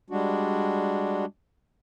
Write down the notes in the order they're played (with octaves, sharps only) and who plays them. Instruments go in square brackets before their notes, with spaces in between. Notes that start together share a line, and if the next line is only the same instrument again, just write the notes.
[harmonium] G3 G#3 D4 F#4